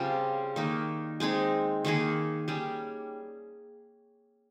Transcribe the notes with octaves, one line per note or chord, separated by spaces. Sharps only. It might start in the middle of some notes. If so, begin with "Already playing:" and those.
Already playing: C#3 G3 C4 F4
D#3 A#3 D#4
G#3 C4 D#4 G#4
D#3 A#3 D#4 G#4
G3 C#4 G#4